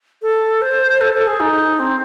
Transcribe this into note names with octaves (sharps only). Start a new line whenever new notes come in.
A4
C5
A4
A4
G#4
D#4
C4